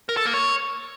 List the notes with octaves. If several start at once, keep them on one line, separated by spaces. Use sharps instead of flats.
A#4
A4
A#3
C#5